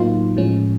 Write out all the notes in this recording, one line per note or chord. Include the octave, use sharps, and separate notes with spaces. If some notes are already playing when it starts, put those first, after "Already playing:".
Already playing: A2 F#3 A#3 D#4 F4
A2 F3 G#3 C#4